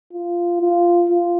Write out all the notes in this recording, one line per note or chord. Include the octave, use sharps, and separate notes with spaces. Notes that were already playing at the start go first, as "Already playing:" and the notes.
F4
F4
F4